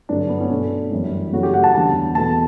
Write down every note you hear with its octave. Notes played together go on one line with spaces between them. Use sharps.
G2 D3 F#3 A3 D4
B3
C#4
B2 A3 D4
F#2 E3 G3
F#2 C#3 F#3 A3 F#4
G4
F#5
A5
E2 D3 G3 A5
E2 B2 A3 A5